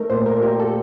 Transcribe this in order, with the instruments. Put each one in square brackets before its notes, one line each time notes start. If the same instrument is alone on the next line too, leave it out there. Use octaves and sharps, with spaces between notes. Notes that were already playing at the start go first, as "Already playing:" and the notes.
Already playing: [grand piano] A3 D#4 [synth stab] A#4
[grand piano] A#2 [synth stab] C5
[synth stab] A#4
[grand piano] G4 [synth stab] A#4
[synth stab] A4